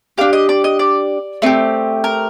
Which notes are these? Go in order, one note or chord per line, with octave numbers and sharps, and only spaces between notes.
D4 G4 F5
D#5
D5
D#5
D5
A3 C4 G4
A#4